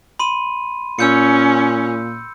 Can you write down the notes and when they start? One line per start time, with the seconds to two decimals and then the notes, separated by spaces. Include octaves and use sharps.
0.19 B5 C6 D#7
0.99 A#2 C#4 E6 G6 C#7